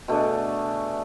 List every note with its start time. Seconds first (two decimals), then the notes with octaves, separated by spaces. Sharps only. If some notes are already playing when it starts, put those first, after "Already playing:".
0.08 B2 A3 D4 G#4